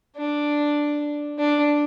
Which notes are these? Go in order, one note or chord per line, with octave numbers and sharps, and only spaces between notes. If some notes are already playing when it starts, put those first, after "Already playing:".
D4
D4